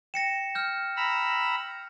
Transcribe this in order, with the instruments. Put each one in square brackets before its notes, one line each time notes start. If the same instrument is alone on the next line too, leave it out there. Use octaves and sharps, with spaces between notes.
[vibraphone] G5 [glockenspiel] A#6 C#7 E7
[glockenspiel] F6 G6
[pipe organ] A#5 B5 E6